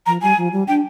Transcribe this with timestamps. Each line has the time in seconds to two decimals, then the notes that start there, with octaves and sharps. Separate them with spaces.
0.06 F3 A#5
0.22 G3 G#5
0.37 F3
0.53 G3
0.68 D4 G5